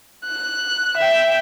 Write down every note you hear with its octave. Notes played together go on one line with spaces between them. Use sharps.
F#6
E5 G5